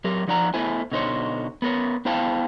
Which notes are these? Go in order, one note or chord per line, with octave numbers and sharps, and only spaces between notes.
F#3 G4 A#4
F3 D#4 D5 F#5 A#5
A3 B3 E4 C5 G#5
B2 D3 D#4 C5 C#5
B3 A#4 C#5
B3 E4 C5 F5 G5 A5